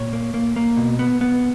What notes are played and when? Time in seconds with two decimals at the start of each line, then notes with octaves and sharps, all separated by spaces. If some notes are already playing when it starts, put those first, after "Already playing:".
Already playing: A#2 C#5
0.13 A#3
0.34 A#3
0.56 A#3
0.77 B2
0.99 B3
1.21 B3